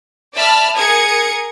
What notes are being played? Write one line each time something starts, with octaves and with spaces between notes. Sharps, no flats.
D5 E5 A5 B5 F6
G#4 A#4 D#6 G#6 C#7